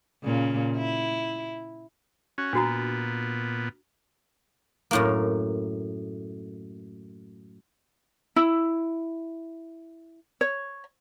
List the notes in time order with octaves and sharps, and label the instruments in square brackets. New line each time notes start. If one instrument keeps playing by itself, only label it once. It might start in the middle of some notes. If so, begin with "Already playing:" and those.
[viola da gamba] A#2 C#3
E4
[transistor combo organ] C#4 F#4
[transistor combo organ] A#2 B3 [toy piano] D4 F#4 A#5
[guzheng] F#2 A2 A#3
[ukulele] E4
C#5